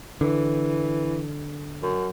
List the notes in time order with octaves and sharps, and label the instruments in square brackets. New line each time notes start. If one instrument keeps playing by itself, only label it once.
[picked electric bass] D3 [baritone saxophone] E3
[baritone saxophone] F#2